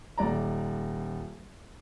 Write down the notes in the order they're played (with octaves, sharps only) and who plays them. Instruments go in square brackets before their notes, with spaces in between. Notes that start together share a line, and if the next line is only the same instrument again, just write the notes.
[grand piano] D#1 D5 A#5